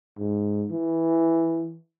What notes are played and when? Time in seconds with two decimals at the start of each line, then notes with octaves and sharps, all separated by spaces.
0.18 G#2
0.71 E3